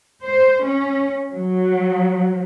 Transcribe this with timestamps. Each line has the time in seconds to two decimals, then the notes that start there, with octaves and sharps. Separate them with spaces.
0.23 C5
0.65 C#4
1.31 F#3